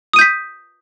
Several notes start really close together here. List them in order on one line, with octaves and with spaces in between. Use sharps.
D#6 D#7 G6 B6